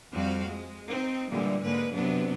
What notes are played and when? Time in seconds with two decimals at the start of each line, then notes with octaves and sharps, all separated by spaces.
0.13 F2 G3 C4 F#4 F5
0.48 G#3
0.90 C4 D#4
1.31 A#2 D3 E3 G3 G#3
1.63 G#2 D3 G#3 A#3 B4
1.94 F#2 C3 F#3 B3 D4